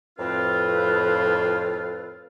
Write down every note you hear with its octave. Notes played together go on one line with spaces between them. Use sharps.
F2 A2 C4 F4 B4